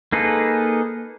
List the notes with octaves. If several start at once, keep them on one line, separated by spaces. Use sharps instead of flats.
A#3 D#4 G#4 A4 B4